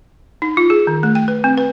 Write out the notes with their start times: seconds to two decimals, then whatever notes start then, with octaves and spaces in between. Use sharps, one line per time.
0.42 D#4
0.57 F4
0.70 G#4
0.87 D#3
1.03 A3
1.15 G5
1.28 B4
1.44 C4
1.57 B4